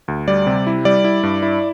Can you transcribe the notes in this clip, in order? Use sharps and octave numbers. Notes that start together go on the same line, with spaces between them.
D2
G3 D5
C3
E4
G3 D5
E4
G2
E4